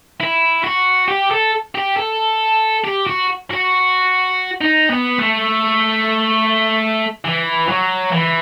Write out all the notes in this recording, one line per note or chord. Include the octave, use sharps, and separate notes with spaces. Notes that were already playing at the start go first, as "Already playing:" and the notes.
E4
F#4
G4
A4
G4
A4
G4
F#4
F#4
D#4
B3
A3
E3
F#3
E3